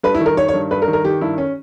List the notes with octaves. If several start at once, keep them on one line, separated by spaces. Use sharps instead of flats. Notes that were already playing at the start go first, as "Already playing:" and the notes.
G2 B4
E4
D#3
A#4
D#3 C#5
C#5
G2
G2 B4
A#4
D#3
A#4
D#3 G4
G2 E4
C#4